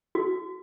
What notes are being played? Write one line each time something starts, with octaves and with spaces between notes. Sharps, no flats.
F#4